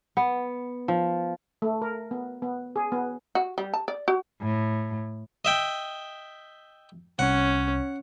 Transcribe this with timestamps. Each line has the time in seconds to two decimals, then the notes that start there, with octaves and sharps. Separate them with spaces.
0.17 B3
0.88 F3
1.62 A3
1.82 A#4
2.11 B3
2.42 B3
2.76 G#4
2.92 B3
3.35 F#4
3.58 G3
3.74 A5
3.88 D5
4.08 F#4
4.41 A2
5.45 D#5 E5 G5
7.19 C2 C#4 C#5 F#5